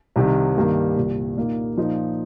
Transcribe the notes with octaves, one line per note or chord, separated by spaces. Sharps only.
C2 C3 D#3
G2 D#3 G3 A#3
C2 A#2 G3
A#2 A#3 D#4
A#2 F3 D#4